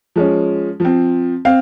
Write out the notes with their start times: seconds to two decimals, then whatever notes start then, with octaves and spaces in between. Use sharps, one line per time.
0.16 F3 G#3 C#4
0.80 F3 C4
1.45 C4 F5